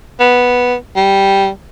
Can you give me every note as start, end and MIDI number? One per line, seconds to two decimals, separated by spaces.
0.20 0.75 59
0.96 1.49 55